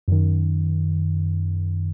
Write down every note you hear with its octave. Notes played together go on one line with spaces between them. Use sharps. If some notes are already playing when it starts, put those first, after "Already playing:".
F#2 D#3